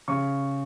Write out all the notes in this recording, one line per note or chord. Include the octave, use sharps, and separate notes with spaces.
C#3 C#6